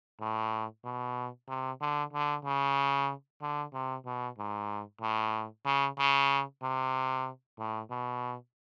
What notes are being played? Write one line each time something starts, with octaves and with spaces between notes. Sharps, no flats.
A2
B2
C3
D3
D3
C#3
D3
C3
B2
G#2
A2
C#3
C#3
C3
A2
B2